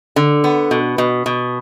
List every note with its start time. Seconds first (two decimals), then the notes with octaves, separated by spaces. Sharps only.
0.16 D3
0.44 B3
0.71 B2
0.98 B2
1.26 B2